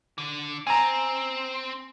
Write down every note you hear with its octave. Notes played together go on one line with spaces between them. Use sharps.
D3
C4 G#5 A#5